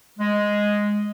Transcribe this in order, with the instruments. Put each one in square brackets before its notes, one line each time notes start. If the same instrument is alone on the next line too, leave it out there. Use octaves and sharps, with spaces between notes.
[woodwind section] G#3